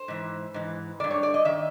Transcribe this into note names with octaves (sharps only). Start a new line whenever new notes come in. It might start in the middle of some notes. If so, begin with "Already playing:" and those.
Already playing: C5
G#2 E3
G#2 E3
D#3 D5
G2
C#5
D5
D#5
D#3 E5